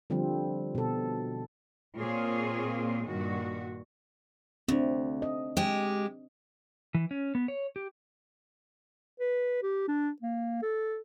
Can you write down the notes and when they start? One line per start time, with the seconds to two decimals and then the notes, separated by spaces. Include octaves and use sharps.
0.10 D3 F3 G3 C4
0.75 B2 A4
1.98 A#2 A#3 C4 F4 G#4 C#5
3.07 G2 A#2 D#3 F#4
4.68 D2 C4 D4
5.22 D#5
5.57 G#3 G4
6.95 E3
7.11 C#4
7.35 B3
7.48 C#5
7.76 G4
9.20 B4
9.63 G4
9.88 D4
10.22 A#3
10.62 A4